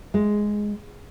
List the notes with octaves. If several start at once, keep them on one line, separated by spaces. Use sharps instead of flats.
G#3